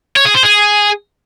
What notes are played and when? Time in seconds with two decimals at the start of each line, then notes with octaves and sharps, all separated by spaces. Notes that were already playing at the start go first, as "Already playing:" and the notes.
0.16 C#5
0.25 G#4
0.34 C5
0.43 G#4